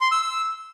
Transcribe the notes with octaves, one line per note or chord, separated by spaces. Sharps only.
C6
E6
E6